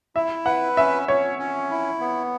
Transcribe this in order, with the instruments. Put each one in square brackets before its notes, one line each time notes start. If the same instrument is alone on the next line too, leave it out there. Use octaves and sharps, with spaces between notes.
[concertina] E4 [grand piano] E5
[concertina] B4 [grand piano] F#5
[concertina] C#4 [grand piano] E5
[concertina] C#4 [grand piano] C#5
[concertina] C#4
E4
B3